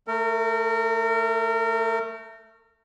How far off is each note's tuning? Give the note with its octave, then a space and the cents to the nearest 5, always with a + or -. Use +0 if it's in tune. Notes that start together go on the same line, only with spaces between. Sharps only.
A3 +10 A#4 -30